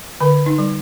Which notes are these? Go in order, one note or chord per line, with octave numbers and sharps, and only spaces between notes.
D3 B4
D#4
G3